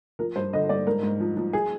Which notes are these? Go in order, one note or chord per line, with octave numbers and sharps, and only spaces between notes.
F3 A#4
G2 C5
D3 D#5
G2 D5
G#2 A#4
G#2
F3
F3
G#4